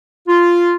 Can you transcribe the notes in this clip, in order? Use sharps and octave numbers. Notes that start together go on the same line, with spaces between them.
F4